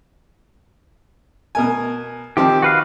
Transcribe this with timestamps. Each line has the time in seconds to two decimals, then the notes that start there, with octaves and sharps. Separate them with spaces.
1.55 B2 A#4 G#5
2.37 D#3 F3 C4 G4
2.62 F#4 B4 F5